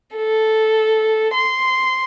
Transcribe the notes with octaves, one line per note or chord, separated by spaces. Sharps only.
A4
C6